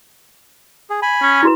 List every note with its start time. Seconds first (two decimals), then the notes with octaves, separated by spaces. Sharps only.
0.90 G#4
1.02 G#5 B5
1.22 C#4
1.43 E4 F#4 B4